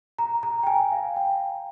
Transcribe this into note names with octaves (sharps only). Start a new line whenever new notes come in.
A#5
A#5
G5
G#5
F5
G5